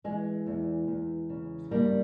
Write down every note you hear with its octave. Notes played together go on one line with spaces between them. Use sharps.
E3 G#3
E2
E2
C#3
G2 G3 A#3